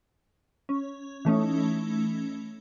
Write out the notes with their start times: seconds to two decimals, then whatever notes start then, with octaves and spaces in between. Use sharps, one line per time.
0.69 C#4
1.25 E3 A3 C#4 D#4